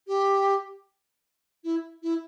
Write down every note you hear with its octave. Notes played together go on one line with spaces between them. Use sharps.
G4
E4
E4